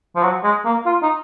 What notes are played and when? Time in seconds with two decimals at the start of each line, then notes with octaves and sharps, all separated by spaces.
0.16 F3
0.23 F#3
0.44 G#3
0.65 A#3
0.86 F4
1.03 D#4